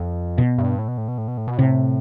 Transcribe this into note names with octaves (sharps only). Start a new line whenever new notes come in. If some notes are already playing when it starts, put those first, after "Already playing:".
Already playing: F2
B2
G2
A2
B2
A2
B2
A2
B2
A2
B2
A2 C3